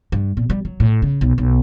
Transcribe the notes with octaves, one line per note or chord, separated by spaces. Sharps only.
G2
A#2
G3
F#3
A2
C#3
B1
B1